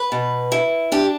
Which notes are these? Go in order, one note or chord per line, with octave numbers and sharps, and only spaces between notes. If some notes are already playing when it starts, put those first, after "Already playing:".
Already playing: B4
B2
E4
D4 G4